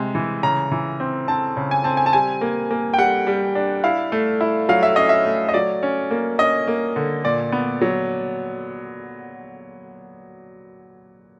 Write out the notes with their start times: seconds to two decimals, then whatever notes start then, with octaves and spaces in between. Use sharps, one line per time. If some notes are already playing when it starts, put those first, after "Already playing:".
Already playing: C3 G#3
0.15 E3
0.43 C#3 A#5
0.72 E3
1.00 C4
1.28 C4 A5
1.57 C#3
1.71 G#5
1.84 C4 A5
1.97 G#5
2.06 A5
2.13 G3 G#5
2.41 A#3
2.71 A#3
2.94 G5
2.98 G3 F#5
3.27 G3
3.55 D4
3.84 E4 F5
4.12 A3
4.41 E4
4.69 F#3 F5
4.83 E5
4.96 C#4 D#5
5.09 E5
5.26 A3
5.49 D#5
5.54 F#3 D5
5.83 C#4
6.11 A#3
6.39 C#4 D#5
6.68 A#3
6.96 D3
7.24 A#2 D5
7.52 B3
7.81 F#3